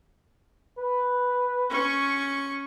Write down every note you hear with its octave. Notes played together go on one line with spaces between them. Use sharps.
B4
C#4 C#6